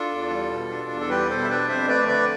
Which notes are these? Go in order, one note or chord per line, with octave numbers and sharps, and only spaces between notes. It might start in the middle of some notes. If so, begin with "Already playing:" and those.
Already playing: D4 F4 A4
E2
G3
B2
D4
E2
A4
G3 G4 B4
B2 A4 C5
E5
D4 B4 D5
F2 C5 E5
A3 B4 D5
D3 B4 D5